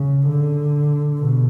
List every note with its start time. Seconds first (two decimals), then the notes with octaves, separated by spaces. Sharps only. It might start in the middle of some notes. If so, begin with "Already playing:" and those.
Already playing: C#3
0.28 D3
1.19 B2